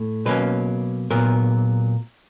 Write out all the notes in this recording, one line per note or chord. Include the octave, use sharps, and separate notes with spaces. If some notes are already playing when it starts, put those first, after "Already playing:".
Already playing: A2
B2 F#3 A#3 C#4 B4
A#2 F#3 B3 A#4